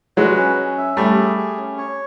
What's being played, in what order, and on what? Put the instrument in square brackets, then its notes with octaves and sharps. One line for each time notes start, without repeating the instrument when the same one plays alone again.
[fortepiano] F#3 G#3 [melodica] B4
[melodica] C#4
C#4
E5
[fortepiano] G3 A3 [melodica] C#4
[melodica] G#4
G#4
C#4
C#5